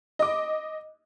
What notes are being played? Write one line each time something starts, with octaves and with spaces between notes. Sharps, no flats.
D#5 D6